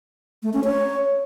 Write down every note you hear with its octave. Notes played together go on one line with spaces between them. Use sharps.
A3
C#4
C#5